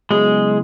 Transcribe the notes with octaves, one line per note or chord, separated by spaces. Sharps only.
C#3 F#3 G#3 B3 E4 G#4